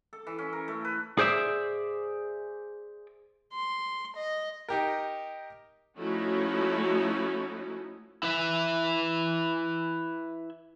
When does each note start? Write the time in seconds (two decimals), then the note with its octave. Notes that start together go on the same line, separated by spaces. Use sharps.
0.13 A4
0.27 E3
0.39 C#4
0.53 A#4
0.68 A3
0.85 B4
1.18 G#4 C5 D5 E5
3.54 C6
4.17 D#5
4.68 D#4 G4 A#4
5.98 F3 A3 C#4 D#4 E4 F#4
8.23 E4 B4 E5